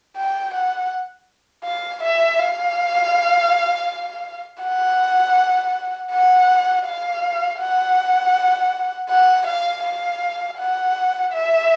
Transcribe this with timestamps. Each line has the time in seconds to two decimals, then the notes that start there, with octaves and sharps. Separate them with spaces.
0.17 G5
0.54 F#5
1.65 F5
2.03 E5
2.39 F5
4.63 F#5
6.12 F#5
6.85 F5
7.60 F#5
9.09 F#5
9.47 F5
9.84 F5
10.58 F#5
11.33 E5